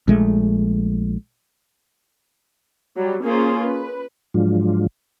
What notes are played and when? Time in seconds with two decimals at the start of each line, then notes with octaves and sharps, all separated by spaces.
0.08 A#1 G#3 A3
2.96 F#3 G3
3.24 A#3 C#4 F4 G#4 C5
3.61 B4
4.34 G#2 F3 F#3 G#3 D4 F4